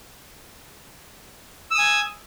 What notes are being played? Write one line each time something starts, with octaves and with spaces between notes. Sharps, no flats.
G#5 D#6 E6